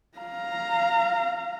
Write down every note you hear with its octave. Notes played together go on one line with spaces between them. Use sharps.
F5 A#5